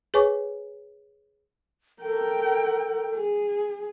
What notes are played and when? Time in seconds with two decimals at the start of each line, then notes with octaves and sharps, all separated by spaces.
0.14 G#4 B4 C#5 G#5 C#6 D6
2.03 A4 A#4 G5
3.15 G#4